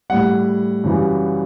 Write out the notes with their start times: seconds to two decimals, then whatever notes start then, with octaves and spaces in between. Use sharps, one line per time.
0.10 A2 G3 F#5
0.84 F#2 C#3 E3 G3